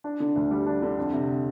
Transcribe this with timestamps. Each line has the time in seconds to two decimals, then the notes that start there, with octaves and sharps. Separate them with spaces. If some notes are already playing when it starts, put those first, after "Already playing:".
0.04 D4
0.20 D3
0.36 D2
0.51 G3
0.67 D4
0.82 D3
0.97 F2
1.13 C3